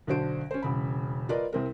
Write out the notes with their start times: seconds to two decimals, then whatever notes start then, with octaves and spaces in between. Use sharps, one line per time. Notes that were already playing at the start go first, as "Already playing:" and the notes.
0.07 B1 D3 D4 F#4 C5 D7
0.51 C#4 C5
0.62 E1 C#3 B5
1.29 F4 A#4 B4 D5 D#5
1.53 C2 C4 A#4